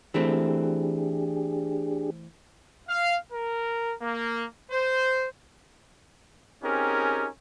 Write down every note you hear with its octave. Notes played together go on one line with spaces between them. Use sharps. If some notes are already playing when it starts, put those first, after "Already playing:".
E3 A3 C4 D4 G4 G#4
F5
A#4
A#3
C5
C4 C#4 D#4 G4 G#4 A#4